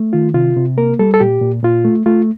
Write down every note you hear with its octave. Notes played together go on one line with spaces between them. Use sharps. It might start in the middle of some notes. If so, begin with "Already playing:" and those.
Already playing: A3
D#3 F4
C3 F4
C3
A#3 A#4
G3 A4
A4
A#2 G4
A#2
A#2 F4
A3
A3 F4